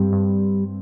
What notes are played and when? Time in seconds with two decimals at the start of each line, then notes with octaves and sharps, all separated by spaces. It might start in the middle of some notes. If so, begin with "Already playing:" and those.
Already playing: G2 G3 C4
0.13 G2